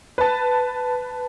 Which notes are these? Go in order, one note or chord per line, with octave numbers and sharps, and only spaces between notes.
B4 A5